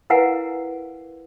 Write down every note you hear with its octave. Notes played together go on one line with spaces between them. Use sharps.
E4 A#4 B4 F5 F#5 G#5